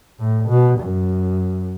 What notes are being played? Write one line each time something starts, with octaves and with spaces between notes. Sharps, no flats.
A2
B2
F#2